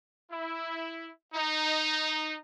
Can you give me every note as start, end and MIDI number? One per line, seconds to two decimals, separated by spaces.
0.31 1.08 64
1.34 2.36 63